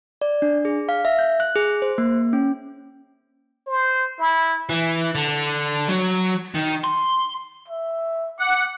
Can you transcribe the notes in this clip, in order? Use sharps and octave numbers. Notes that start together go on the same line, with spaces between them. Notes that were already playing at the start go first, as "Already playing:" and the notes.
D5
D4
G#4
F5
E5
G6
F#6
G#4
C5
A#3
C#4
C5
E4
E3
D3
F#3
D#3
C6
E5
F#5 D6